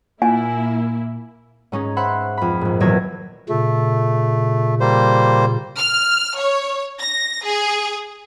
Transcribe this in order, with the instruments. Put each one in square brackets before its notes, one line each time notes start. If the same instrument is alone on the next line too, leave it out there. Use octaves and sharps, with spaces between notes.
[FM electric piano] A#2 [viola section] A#3 E4 [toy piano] G#5
[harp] G#2 C#4 D#4 G#4
C5 E5 F#5 B5 C6 F#6
F2 B5
A#1 G#2
D#1 E2 F#3 E5 G#6 A#6
[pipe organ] A#2 C#3 [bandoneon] A3
[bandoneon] G3 A#3 C5
[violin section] F6
C#5
A#6
G#4